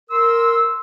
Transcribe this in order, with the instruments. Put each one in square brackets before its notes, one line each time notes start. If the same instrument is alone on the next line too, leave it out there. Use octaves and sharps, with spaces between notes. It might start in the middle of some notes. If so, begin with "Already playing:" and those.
[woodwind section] A#4 C6 E6